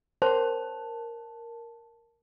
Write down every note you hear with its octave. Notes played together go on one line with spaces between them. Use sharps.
A#4 C5 A5